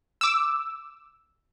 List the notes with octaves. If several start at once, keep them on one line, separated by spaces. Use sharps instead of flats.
D6 E6